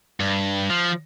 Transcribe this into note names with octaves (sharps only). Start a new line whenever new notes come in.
G2
F3